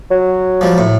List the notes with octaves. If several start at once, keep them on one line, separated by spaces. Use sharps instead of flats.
F#3
F3 G3
A2